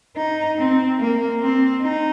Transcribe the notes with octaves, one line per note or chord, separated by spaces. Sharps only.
D#4
C4
A#3
C4
D#4